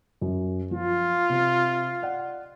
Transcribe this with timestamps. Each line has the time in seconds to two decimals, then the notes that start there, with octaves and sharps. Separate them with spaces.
0.21 F#2
0.71 F3 F4
1.29 C3
2.02 D5 F#5